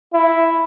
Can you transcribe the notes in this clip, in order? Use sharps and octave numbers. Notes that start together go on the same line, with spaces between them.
E4